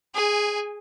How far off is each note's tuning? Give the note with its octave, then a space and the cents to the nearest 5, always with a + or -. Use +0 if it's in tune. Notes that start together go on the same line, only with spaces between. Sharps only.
G#4 +0 G#5 -15